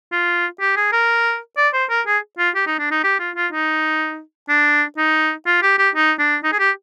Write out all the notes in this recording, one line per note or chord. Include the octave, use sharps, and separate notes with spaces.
F4
G4
G#4
A#4
D5
C5
A#4
G#4
F4
G4
D#4
D4
D#4
G4
F4
F4
D#4
D4
D#4
F4
G4
G4
D#4
D4
D#4
G#4
G4